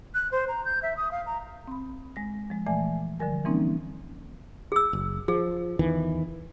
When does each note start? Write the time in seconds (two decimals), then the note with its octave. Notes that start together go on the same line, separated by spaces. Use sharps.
0.14 F#6
0.31 C5
0.48 A#5
0.65 G6
0.83 E5
0.97 D#6
1.11 F5
1.26 A#5
1.68 C4 B5
2.16 G#3 A#6
2.50 F3 G#3
2.66 A#2 E3 A3 D5 E5 G#5
3.20 D3 F3 G3 A#4 G#5
3.45 E3 G3 A#3 C4 C#4 D#4
4.72 G#4 E6
4.93 F#1
5.28 F3 G#4
5.79 E2 D#3 E3